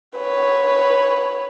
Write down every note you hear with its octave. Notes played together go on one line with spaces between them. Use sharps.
B4 C#5